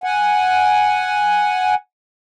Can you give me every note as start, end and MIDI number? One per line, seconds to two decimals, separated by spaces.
0.04 1.75 78
0.04 1.75 80